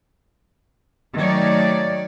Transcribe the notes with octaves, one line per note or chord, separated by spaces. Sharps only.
D#3 F#3 A3 C#5 D5